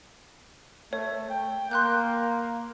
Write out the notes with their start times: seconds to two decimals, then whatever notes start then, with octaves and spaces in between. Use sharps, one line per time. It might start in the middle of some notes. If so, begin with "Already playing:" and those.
0.93 A3 C#5
1.30 G5
1.71 A#3 C6 F#6 G6